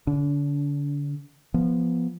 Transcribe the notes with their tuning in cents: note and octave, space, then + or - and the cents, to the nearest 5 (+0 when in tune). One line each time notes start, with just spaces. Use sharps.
D3 -25 D4 -45
F3 -10 B3 -15